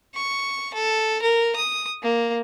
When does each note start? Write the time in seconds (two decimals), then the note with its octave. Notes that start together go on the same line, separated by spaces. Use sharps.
0.15 C#6
0.74 A4
1.22 A#4
1.56 D#6
2.03 A#3